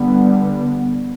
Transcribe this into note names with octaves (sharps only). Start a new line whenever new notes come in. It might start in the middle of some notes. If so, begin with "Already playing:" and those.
Already playing: D3 G3 B3